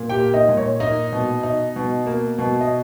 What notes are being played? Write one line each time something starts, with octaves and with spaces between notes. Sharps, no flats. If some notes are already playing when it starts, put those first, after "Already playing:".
Already playing: A#2
G4 G5
A#3
D#4 D#5
A#2
C#5
A#3 D#4 D#5
B2
D#4
B2
A#3
B2
D#5